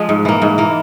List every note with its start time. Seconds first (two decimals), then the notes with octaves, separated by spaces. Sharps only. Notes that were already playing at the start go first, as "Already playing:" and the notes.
Already playing: F3 G#3
0.09 G#2
0.25 E3 A#3
0.42 G#2
0.58 E3 A#3